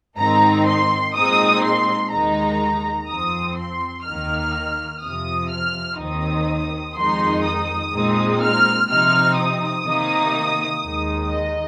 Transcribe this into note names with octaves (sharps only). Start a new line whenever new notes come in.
G#2 D#3 C4 D#4 A#5
C6
A#2 G#3 C4 D#4 D#6
C6
D#2 D#3 G#3 D#4 A#5
F2 F3 C4 D#6
C6
D#2 D#3 A#3 D#4 F6
F2 C3 F3 D#6
F6
D#2 D#3 C4 D#4 D#6
F2 D#3 G#3 D#4 C6
D#6
A#2 G#3 C4 D#4
F6
C3 F3 C4 D#4 F6
D#6
C3 D#3 A#3 D#4
D#2 D#3 G#3 D#4
D#5